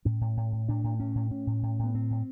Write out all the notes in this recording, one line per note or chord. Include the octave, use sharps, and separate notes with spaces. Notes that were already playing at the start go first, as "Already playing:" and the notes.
A2 C#4
A2
A2
A2
A2 D4
A2
A2 C#4
A2
A2 C#4
A2
A2
A2 B3
A2 C4
A2